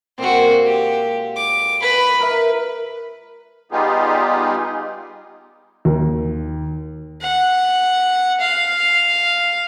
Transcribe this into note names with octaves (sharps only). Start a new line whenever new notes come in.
A#2 G#3 C4 F#4 A4
G4
D6
B4 B5
A#4 B4 E5
G3 B3 D#4 F4 G4 G#4
D#2
F#5
F5